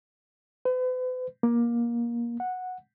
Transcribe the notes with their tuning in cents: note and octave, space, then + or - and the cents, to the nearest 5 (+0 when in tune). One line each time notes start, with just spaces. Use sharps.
B4 +45
A#3 +20
F#5 -10